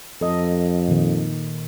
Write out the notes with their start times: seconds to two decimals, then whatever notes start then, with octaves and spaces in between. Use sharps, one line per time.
0.21 F2 A4 D#5
0.88 A#2 D#3